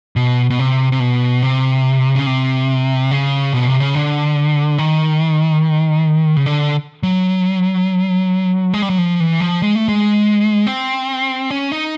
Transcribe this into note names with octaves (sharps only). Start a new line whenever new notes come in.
B2
B2
C3
C3
B2
C3
C#3
C3
C#3
B2
C3
C#3
D3
D#3
C#3
D3
F#3
G#3
G3
F#3
F3
E3
F3
G#3
A3
G#3
C4
C#4
D#4